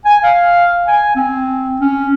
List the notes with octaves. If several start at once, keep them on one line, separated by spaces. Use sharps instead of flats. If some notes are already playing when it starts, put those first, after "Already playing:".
G#5
F5
G#5
C4
C#4